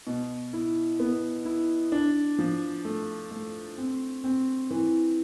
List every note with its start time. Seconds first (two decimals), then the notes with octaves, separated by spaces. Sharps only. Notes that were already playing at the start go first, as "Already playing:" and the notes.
0.07 B2
0.53 E4
1.00 B3
1.45 E4
1.92 D4
2.39 F3
2.85 A3
3.31 A3
3.78 C4
4.24 C4
4.71 E3